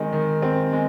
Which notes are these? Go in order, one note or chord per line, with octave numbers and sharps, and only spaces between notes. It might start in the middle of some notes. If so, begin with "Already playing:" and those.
Already playing: D#3 G#3 C4
D#3
C4
G#3